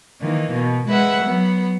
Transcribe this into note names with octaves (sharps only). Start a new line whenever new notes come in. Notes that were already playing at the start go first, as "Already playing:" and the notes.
D#3 E3 A#3
B2
G#3 B4 E5 F#5
F#3 B3